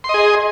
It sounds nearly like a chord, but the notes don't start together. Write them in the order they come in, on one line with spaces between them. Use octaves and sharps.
C6 D#5 G#4